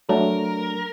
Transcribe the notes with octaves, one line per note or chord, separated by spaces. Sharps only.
F#3 A3 D4 A#4